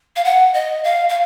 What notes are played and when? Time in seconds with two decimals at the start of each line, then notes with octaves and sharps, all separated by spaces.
0.16 F5
0.25 F#5
0.54 D#5
0.84 F5
1.09 F5